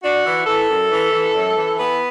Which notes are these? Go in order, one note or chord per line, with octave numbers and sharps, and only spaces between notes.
D4 F#4
E3
E3 A4
F#2
E3
E3
F#2
E3
E3 B3 B4